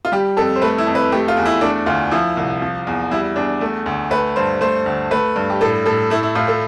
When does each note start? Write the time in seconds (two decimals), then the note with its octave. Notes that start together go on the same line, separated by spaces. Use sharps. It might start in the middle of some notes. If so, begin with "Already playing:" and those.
0.05 F4
0.12 G3 G4
0.37 F2 A4
0.56 C5
0.61 A3 B4
0.78 E4
0.87 F2
0.95 B4
1.12 A3 G4
1.28 F4
1.37 E2
1.45 E4
1.61 A3 D4
1.86 D2 F4
2.11 F3 E4
2.37 C2
2.62 F3
2.87 E2
3.11 G3 E4
3.36 E2 D4
3.61 A3
3.86 D2
4.11 A3 B4
4.36 G2 C5
4.61 A3 C5
4.86 D2
5.11 A3 B4
5.36 G2
5.50 G4
5.61 A2 A4
5.86 A2 A4
6.10 A3 E4
6.23 E4
6.35 A2 F4
6.48 A4